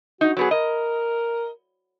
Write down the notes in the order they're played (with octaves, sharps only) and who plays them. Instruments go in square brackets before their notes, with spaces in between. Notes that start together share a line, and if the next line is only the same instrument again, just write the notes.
[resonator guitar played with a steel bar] D#4 [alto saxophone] F#4
[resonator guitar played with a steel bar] F#3 B3 G#4 [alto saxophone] F#4
[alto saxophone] A#4 [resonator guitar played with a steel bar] D#5